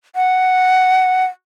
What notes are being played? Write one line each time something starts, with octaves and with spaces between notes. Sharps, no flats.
F#5